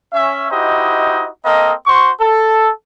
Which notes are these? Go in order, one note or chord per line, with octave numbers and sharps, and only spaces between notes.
C#4 E5
D#4 E4 F#4 G4 C5 D#5
A#3 C4 A4 D#5
F#4 C5 C6 C#6
A4